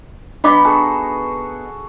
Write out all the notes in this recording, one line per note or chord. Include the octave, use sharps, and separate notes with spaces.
B3 D4 D#4 D#5 B5 D6
F#4 G#4 A4